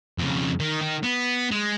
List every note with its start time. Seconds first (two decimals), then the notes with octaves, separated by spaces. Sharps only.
0.18 F2 C#3
0.60 D#3
0.82 D#3
1.03 B3
1.51 G#3